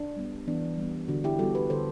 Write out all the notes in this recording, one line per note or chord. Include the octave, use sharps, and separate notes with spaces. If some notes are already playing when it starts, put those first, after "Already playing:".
Already playing: D4
G3 B3
E3 B3 D4
G3 B3
D3 D4 F#4
E4 G4
G3 B3 F#4 A4
G4 B4
D3 A4 C5